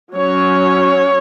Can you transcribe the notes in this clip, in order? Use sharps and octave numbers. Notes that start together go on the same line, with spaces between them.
F#3 C#4 C#5